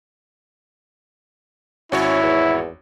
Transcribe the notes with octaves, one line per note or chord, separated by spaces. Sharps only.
G#1 C#4 E4 F#4 C#5
E2